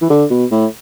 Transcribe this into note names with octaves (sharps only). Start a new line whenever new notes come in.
E3
D3
B2
A2